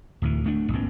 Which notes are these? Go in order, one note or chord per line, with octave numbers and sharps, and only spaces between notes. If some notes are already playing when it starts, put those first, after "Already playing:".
D1 D2 E3
D1 A3 D4
G1 G2 A#3 C4